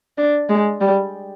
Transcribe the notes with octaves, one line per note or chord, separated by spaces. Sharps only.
D4
G#3
G3